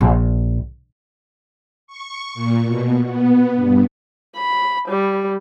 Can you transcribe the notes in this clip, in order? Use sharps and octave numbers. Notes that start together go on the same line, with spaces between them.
A#1
C#6
A#2
B2
B3
G2
B5
G3